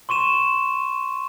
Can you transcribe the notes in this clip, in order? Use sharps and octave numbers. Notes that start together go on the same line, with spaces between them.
C6 C#6 D#7 E7